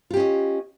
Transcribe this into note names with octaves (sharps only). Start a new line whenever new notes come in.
C#4 F4 G4 D#5